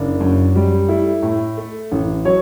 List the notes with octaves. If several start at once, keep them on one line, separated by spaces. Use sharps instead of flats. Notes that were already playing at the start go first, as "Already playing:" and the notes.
Already playing: F#1 D4
F#2
G3
A3 E4
A2
A3
A1
F#3 C#5